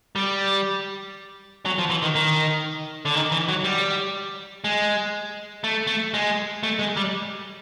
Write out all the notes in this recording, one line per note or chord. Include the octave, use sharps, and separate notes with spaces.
G3
F#3
F3
E3
D#3
D#3
D3
D#3
E3
F#3
G3
G#3
A3
A3
G#3
A3
G#3
G3